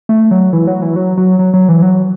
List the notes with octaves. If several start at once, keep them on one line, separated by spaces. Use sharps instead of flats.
A3
F#3
E3
F#3
E3
F#3
F#3
F#3
F#3
E3
F#3